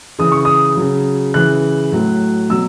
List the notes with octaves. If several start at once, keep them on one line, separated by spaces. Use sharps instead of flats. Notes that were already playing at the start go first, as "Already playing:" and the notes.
C#3 E3 D#6
C#6
D#6
C#3 F#3
C#3 E3 F#6
A2 F#3
B2 F#3 E6